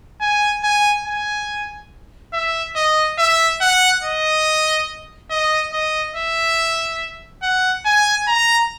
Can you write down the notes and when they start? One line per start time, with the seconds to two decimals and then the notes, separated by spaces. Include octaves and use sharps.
0.21 G#5
0.63 G#5
1.06 G#5
2.33 E5
2.76 D#5
3.18 E5
3.61 F#5
4.03 D#5
5.30 D#5
5.73 D#5
6.16 E5
7.43 F#5
7.85 G#5
8.28 A#5